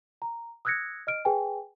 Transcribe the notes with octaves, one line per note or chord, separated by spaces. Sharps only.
A#5
D#6 E6 F#6 G#6 A#6 C#7
D#5 F6 D7
G#4 B4 G5 G#5